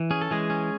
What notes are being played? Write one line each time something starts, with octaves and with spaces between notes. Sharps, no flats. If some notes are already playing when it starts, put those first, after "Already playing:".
Already playing: E3
C#4 G#4
A4
E3 G#3 G#4
C#4